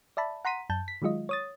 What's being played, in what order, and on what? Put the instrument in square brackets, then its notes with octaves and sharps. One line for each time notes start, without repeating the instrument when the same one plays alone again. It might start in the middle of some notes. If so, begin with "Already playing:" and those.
[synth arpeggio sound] D5 E5 A5 B5
F#5 A#5 C6 B6 D#7
F#2 A5 G6
B6
D#3 F#3 G#3 F4 D#5
C#5 D#6 A6